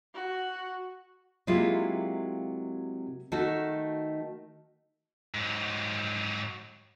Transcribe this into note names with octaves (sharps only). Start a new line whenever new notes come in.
F#4
C3 F#3 G#3 A#3 E4 F4
D#3 A3 F#4 A4
G#2 F#3